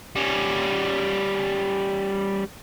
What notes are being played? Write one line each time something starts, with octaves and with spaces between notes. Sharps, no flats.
G3 C#4